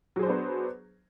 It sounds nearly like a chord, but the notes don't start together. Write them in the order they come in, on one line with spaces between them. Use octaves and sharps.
F#3 G#4 C5 D4 B3